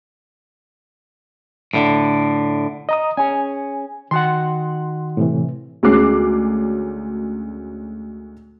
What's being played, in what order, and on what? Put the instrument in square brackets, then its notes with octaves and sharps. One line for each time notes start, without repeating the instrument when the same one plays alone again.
[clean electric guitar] A2 D3
[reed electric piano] D#5 A#5 D#6
[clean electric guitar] C#4 G#4 [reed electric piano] G#5
[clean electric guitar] D#3 F#4 F#5 [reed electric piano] C6
[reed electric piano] A2 C3 E3
[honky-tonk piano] D2 G#3 C#4 D6 F#6 C7